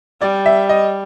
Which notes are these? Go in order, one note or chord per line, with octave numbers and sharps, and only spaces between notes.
G3 D5
E5
D#5